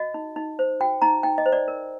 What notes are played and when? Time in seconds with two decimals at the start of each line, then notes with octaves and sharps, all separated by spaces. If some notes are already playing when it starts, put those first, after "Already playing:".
Already playing: F#4 D#5
0.14 D#4
0.36 D#4
0.59 C5
0.80 F#4 G5
1.02 D#4 A#5
1.23 D#4 G5
1.38 D#5
1.46 C5
1.52 D5
1.68 A#4